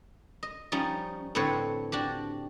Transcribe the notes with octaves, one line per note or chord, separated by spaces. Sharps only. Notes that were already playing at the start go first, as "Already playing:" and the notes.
D#5
F3 G3 C#4 D#4
A2 D3 C4 B4 C#5
D4 F#4 G4